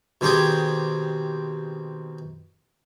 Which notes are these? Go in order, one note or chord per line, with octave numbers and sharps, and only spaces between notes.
B2 D#3 C4 G4 G#4